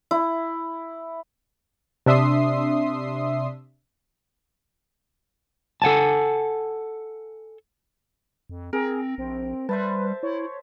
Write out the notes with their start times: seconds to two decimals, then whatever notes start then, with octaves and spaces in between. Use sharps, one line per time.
0.11 E4
2.06 C3 D4 E5 C6 D#6 C7
5.82 A4 F#5 G#5 A5
8.50 F2
8.73 C4 G#4 A#4
9.18 A#1 C4
9.69 G3 B4 C5 E5 A5
10.23 E4 C#5